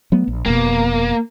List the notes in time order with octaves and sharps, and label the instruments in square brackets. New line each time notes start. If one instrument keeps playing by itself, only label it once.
[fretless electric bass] F#3 A3 B3
A#1
[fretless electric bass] F1 B2 [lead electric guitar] A#3